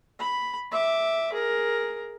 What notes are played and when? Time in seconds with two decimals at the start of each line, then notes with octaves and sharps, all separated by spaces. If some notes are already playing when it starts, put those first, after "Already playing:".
0.20 B5
0.72 E5 D6
1.33 G#4 A#4